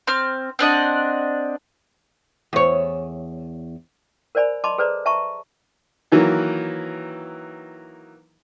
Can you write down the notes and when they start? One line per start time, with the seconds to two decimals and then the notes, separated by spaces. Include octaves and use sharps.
0.07 C4 F6
0.59 C4 D4 D#5 F#5
2.53 E2 C#5
4.35 A#4 C5 D5 G#5 B5
4.64 D#5 A5 B5 C6 D6
4.78 G#4 A4 B4 C5 D5 A#5
5.06 E5 A5 A#5 C#6
6.12 D#3 E3 F#3 A#3